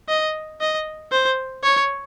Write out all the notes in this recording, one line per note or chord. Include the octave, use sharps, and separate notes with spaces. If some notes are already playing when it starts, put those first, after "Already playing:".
D#5
D#5
C5
C#5